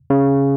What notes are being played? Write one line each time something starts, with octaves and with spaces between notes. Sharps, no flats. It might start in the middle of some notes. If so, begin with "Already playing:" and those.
C#3